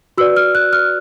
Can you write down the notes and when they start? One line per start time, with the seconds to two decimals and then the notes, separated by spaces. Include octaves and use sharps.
0.18 F#4 B4 D5 E6
0.36 F6
0.55 F#6
0.73 F6